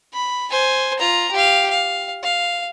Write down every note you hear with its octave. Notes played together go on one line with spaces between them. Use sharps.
B5
C5 G#5
F4 A#5
G4 F5
F5
F5